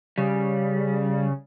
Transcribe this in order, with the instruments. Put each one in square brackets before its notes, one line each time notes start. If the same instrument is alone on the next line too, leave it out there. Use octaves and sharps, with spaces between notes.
[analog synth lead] C#3 [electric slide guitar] G3